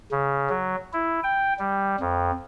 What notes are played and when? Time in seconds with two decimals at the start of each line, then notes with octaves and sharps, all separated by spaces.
0.11 C#3
0.49 F#3
0.93 E4
1.23 G5
1.59 G3
2.00 F2